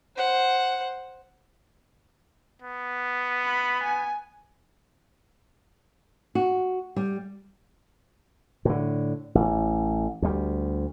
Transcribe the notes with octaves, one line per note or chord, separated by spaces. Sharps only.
C5 F#5
B3
B5
G#5
F#4
G3
A2 D3
A1
D2 G3